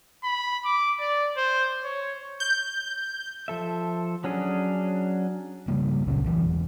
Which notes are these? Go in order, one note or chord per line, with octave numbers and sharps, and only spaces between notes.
B5
D6
D5
C5
C#5
G6
F3 A4 E5
F#3 C#4 D4 G#4
C#3 G3 A#3
C#2 A#2 C#3 C#4
D2 E3
E1